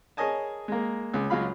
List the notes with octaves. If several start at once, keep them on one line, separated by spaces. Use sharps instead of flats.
G#4 A#4 C#5 D#5 G#5 A5
G#3 A#3
C#2
C#2 F#3 G#3 F4 F5 B5